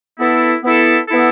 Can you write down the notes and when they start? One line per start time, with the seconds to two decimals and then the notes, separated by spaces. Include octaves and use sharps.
0.19 B3 E4 A4
0.63 B3 E4 A4
1.07 B3 E4 A4